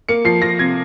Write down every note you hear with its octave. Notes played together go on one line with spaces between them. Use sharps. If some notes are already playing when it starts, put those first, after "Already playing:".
A#3 C#7
F3 C7
F3 A#6
C3 G#6